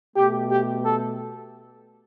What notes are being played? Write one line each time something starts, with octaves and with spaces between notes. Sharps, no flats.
B2 A3 G4
G4
A4